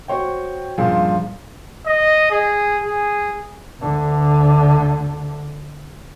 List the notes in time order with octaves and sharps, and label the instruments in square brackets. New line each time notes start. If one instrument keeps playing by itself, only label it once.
[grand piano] F#4 C5 C#5 G5
G2 A#2 C#3 F3
[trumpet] D#5
G#4
G#4
[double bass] D2 D3